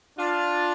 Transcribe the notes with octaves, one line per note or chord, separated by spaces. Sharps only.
D4 F4